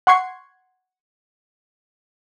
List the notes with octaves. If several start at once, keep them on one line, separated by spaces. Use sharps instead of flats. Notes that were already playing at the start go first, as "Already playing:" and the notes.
F#5 C6 C#6 G#6 C7